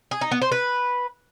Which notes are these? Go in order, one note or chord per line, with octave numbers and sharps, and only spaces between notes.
G#4
D#4
B3
C5
B4